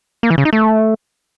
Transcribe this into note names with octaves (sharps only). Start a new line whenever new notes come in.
A#3
E3
C#3
D#4
A3